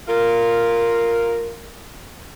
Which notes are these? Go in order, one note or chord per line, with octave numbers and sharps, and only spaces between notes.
F4 A#4